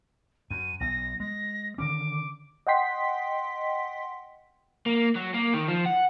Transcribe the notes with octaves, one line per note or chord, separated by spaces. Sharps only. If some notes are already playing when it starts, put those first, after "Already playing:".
F#2 D#7
B1 A#6
G#3 A#6
D3 D#3 C#4 D6
D#5 F#5 G5 C6 B6
A#3
F#3
A#3
D#3
F3
F#5